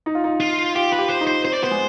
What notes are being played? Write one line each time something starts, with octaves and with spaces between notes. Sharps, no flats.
D#4
F4
D#4
F4
F4 G4
B4
G4
C5
D#4
C5
C4 C5
D5
B3 C5
G#3